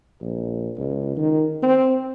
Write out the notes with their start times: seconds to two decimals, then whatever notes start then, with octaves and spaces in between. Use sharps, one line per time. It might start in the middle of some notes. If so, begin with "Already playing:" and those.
0.21 A#1
0.78 C#2
1.17 D#3
1.63 C4